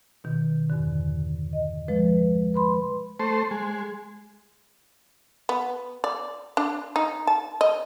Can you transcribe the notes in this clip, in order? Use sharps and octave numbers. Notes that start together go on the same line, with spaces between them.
B2 D#3
E2 G2 D3
D#5
F3 G#3 B4
B4 B5 C6
A3 C5
G#3
B3
D5
D4
D#4
A5
D#5